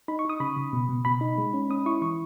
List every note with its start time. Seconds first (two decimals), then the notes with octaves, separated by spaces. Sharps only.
0.08 D#4 B5
0.19 C#6
0.25 D#4 D#6
0.40 C#3 B5
0.56 C#3
0.73 B2
0.89 B2
1.05 B2 B5
1.21 D#4
1.38 G#3
1.53 C#4
1.70 C#4 D#6
1.86 E4 C#6
2.02 E3 C#6